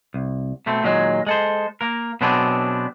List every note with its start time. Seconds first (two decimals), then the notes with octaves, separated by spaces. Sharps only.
0.14 C2
0.66 B2 A3 C4
0.84 A#2 D#3 F#3 G#3
1.27 G#3 A4 C5
1.81 A#3 A#4
2.21 B2 F#3 B3 C4 D4 G#4